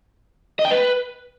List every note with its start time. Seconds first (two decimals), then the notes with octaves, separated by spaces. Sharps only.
0.59 D#5
0.65 G5
0.71 B4